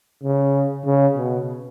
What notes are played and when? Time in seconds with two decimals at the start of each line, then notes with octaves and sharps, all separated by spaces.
0.23 C#3
0.85 C#3
1.17 B2